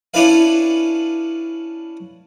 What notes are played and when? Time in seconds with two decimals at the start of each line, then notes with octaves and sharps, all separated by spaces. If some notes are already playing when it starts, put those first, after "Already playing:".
0.14 C#4 D4 E4 A4 B4 F5